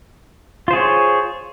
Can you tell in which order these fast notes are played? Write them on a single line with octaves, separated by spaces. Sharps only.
F4 C5 G#4 C#5